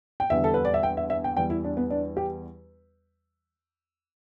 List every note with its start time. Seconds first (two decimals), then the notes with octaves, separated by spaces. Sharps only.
0.20 G5
0.30 E2 D3 G3 E5
0.44 A4
0.54 B4
0.65 D5
0.74 E5
0.83 G5
0.97 E5
1.10 E5
1.24 G5
1.37 E2 E3 G3 G5
1.50 E4
1.64 D4
1.77 B3
1.91 D4
2.17 G4